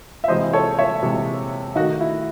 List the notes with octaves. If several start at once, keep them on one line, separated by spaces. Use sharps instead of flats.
E5
C3 E3 G#3 C5 D#5
A4 C#5
C#5 E5
C3 E3 G#3
D#3 A3 D#4 F#4
E4